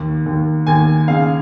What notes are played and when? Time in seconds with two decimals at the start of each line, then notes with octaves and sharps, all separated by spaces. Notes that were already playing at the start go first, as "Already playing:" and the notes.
Already playing: D#2
0.26 D#2
0.67 D#2 G#5
1.08 C#3 F5